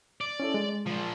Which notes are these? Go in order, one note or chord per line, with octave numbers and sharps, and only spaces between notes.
D5
C#4 E4 A4
G#3
A#2 F3